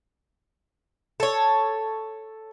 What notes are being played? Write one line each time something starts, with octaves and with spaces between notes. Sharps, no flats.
A4 C#5